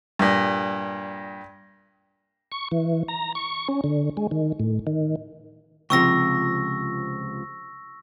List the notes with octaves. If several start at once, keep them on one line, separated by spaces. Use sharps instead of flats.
G2 A#2
C#6
E3
A#5
C#6
C#4
D3
G#3
D#3
A2
D#3
C#2 C3 F3 C#6 E6 A#6